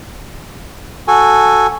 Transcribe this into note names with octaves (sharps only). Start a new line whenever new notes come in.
F#4 A4 G#5